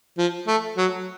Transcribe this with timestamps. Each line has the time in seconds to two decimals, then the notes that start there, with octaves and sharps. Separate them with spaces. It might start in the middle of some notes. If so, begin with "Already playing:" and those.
0.18 F3
0.48 A3
0.77 F#3